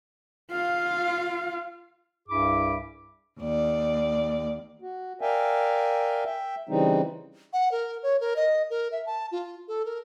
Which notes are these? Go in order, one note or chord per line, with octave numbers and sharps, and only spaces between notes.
F4 F5
C2 G2 E4 G#4 B5 D6
D#2 D5
F#4
A#4 D5 E5 F5 G5 G#5
E5 G5
C#3 E3 G3 C4 D#4
F#5
A#4
C#5
A#4
D#5
A#4
E5
A5
F4
A4
A#4